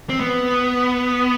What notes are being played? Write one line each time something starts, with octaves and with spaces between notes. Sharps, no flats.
C4
B3